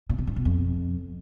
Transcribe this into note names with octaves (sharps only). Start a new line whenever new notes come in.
A#2
B2
G#2
B2
F2